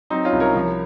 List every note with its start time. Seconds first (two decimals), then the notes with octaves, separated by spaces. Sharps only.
0.10 F#3 C4 D#4
0.25 C#4 F4
0.33 C2
0.40 A#4 C#5
0.55 F3